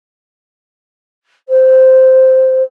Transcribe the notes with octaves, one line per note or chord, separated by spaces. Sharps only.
C5